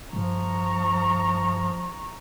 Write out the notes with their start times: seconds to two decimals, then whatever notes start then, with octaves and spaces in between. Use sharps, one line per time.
0.13 G2 F3 A#5 C#6